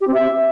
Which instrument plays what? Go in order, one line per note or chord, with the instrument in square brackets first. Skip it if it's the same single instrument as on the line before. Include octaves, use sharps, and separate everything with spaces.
[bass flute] G4
C4
E5